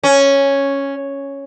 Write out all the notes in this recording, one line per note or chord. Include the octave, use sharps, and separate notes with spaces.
C#4